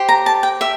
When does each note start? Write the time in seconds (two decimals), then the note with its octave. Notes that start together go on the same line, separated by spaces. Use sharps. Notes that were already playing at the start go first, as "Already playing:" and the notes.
Already playing: G4 C5
0.09 A#5
0.26 A5
0.43 G5
0.61 G4 E5